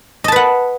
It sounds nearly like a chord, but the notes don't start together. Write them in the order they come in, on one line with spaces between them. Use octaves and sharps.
D#5 A5 B4 F#5